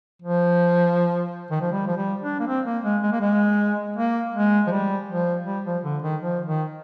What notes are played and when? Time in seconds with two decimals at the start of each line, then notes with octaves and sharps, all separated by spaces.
0.22 F3
1.51 D#3
1.61 F3
1.72 G3
1.87 F3
1.97 G3
2.22 D4
2.40 A#3
2.47 C4
2.66 A#3
2.84 G#3
3.03 G#3
3.12 A#3
3.21 G#3
3.97 A#3
4.34 G#3
4.67 F3
4.71 G3
5.09 F3
5.46 G3
5.65 F3
5.84 D3
6.02 D#3
6.21 F3
6.46 D#3